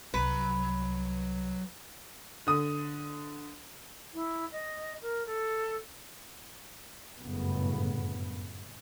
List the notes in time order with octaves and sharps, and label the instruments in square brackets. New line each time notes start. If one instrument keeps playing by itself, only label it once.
[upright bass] C2 [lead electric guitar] F#3 A#5 [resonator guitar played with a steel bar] B4
[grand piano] D3 D#6
[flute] E4
D#5
A#4
A4
[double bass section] G1 F#2 A2 C#3 B3